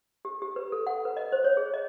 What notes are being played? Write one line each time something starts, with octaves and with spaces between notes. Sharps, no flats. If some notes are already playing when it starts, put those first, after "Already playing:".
G4
G4
B4
A4
F#5
B4
D#5
C5
C#5
G#4
D#5